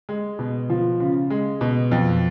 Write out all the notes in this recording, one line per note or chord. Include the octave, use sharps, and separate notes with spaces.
G#3
B2
F3
C#3
G#3
B2
F2